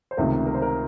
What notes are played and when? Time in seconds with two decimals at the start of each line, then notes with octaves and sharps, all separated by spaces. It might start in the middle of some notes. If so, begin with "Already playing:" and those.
0.11 C5
0.17 C#2 C3 D#3 A3 A#4
0.47 A#4
0.54 C5
0.62 A#4